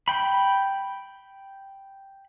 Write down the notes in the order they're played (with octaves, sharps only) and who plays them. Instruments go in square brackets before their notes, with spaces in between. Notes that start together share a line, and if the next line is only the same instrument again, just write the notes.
[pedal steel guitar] G5 B5